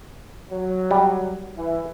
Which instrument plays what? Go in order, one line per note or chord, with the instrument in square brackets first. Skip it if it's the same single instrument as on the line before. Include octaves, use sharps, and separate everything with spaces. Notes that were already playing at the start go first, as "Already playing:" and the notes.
[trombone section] F#3
[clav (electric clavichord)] G3
[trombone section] E3